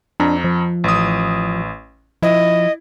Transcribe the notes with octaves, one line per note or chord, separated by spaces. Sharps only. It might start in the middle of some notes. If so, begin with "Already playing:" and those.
F2 D4 A#5
F3
A1 D#6
F3 E4 D#5